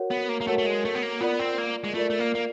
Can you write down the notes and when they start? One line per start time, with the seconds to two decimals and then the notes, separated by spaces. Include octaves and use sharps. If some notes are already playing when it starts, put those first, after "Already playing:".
Already playing: F#4 A#4 C#5 F#5
0.11 B3
0.29 A#3
0.41 A#3
0.47 A3 F#4 A#4 C#5 F#5
0.58 A3
0.66 G#3
0.85 A3
0.95 B3
1.03 A#3
1.21 B3 F4 A#4 D5
1.40 C4
1.58 A#3
1.84 G#3
1.94 A3 F4 A#4 D5
2.10 A3
2.19 A#3
2.35 A#3